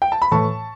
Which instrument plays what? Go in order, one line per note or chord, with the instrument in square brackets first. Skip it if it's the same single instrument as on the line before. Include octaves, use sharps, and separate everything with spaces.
[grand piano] G5
A5
B5
A2 E3 A5 C#6